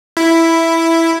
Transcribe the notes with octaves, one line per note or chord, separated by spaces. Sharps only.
E4